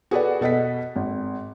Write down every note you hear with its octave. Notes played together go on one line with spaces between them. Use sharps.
F#4 G#4 A4 B4 D5 F#5
B2 A4 D#5 F#5 B6
G#1